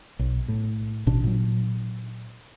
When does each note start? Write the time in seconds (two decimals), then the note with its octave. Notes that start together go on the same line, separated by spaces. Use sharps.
0.19 B1
0.48 A2
1.07 A1 B2 D4
1.24 A#2 F#3